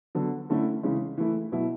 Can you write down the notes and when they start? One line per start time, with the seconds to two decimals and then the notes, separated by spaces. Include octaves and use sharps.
0.15 D3 F#3 B3
0.50 D3 A3 C#4 E4
0.83 C#3 E3 G#3 C#4
1.18 E3 A3 E4
1.52 B2 F#3 B3 E4